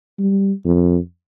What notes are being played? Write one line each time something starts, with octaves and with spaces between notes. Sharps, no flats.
G3
F2